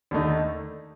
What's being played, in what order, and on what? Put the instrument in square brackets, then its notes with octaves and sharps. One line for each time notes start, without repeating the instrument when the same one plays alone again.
[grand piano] D#2 D3 A3 D#4